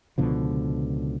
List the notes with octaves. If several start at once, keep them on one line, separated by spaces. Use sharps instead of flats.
C#2 B2 D3 F3